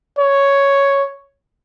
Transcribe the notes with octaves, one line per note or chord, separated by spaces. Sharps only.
C#5